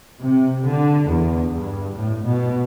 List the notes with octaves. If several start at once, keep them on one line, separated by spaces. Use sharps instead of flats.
C3
D3
E2
G2
A2
B2